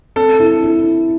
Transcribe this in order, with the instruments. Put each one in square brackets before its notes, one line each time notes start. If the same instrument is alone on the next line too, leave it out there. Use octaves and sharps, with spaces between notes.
[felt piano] C4 [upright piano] A4
[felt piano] E4
E4